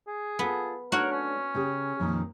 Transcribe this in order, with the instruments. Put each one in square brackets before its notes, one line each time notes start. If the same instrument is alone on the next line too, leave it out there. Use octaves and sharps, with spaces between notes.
[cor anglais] G#4
[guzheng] B3 [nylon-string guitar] F4 A4
[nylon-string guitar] A3 D4 [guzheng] F#4 C#5 F#5 [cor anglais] A#4
[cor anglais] C#4
[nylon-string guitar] C#3 G4 G#4
F2 A#2 D#3